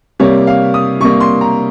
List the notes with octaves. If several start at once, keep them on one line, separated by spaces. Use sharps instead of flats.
C3 G3 A#3 C#5
F5
D#6
C3 G3 A#3 C#6
C6
A#5